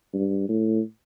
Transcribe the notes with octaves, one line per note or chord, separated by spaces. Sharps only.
G2
A2